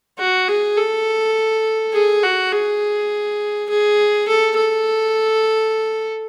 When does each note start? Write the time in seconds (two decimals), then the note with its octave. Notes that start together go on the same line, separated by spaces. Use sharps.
0.19 F#4
0.48 G#4
0.77 A4
1.93 G#4
2.23 F#4
2.52 G#4
3.69 G#4
4.28 A4
4.56 A4